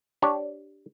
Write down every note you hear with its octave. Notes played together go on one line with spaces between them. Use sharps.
D4 G4 C#5